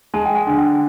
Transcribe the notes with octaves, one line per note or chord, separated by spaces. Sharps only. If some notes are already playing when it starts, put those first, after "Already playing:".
G#3 A5
G5
G#5
D3
G5